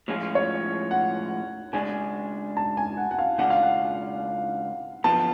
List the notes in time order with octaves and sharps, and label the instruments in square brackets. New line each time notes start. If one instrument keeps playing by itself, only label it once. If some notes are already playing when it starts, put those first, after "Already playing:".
[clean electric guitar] A2 F3 G#3 C#4 F4
[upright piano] C#5
F#5
[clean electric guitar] C#3 G#3 D4 [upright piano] G#5
[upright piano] A5
G#5
F#5
F#5
F5
[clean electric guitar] C#2 C#3 G#3 D4 F4 [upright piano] F#5
[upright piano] F5
F#5
[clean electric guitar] F#2 D3 F3 B3 F4 [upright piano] A5